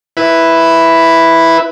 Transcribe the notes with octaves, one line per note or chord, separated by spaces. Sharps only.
E4 B4